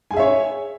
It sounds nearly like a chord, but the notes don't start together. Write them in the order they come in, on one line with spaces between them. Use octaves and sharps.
G#5 G#4 E5 C#5